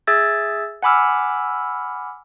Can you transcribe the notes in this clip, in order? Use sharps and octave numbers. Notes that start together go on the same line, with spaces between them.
G#4 E5 E6 G#6 A6
F#5 G#5 B5 D6 E6 F6